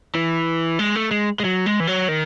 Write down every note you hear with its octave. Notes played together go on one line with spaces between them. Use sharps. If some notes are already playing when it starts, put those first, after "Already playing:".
E3
G#3
A3
G#3
G#3
F#3
G#3
E3
F#3
D#3